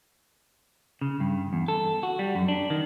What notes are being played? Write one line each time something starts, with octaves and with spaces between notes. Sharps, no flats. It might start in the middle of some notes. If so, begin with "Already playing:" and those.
C#3
G2
E2
A4
F#4
G3
F#2
D4
D#3